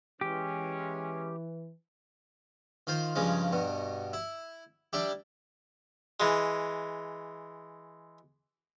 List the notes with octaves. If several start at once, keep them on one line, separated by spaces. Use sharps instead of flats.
E3 G#3 C#4 G4
D#3 F4 C5
G2 C#3 F3 G#3
G2 B2
E4
G3 D4 E4 G4
E3 G#3